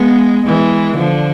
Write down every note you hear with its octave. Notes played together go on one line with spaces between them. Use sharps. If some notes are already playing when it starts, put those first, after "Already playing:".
Already playing: G#3 B3
E3 G#3
D3 F3